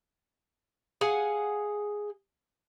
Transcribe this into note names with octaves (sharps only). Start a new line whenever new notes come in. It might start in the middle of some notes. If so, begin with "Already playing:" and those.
G#4 F5 F#5 G#5